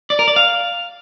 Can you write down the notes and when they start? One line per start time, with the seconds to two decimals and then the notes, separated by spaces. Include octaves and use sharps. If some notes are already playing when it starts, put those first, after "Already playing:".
0.10 D5
0.19 A#4
0.28 D5
0.36 F5